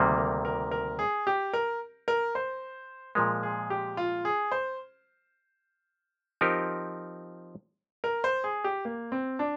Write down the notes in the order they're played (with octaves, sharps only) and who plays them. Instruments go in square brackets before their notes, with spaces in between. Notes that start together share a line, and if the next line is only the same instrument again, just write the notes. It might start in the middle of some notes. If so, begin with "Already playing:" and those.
Already playing: [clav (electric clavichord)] D2 C3 D#3 G3 A#3
[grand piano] A#4
A#4
A#4
G#4
G4
A#4
A#4
C5
[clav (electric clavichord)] A#2 F3 G#3 [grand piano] A#4
[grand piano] G#4
G4
F4
G#4
C5
[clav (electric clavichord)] F3 C4 D#4 G4 A#4
[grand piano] A#4
C5
G#4
G4
A#3
C4
D4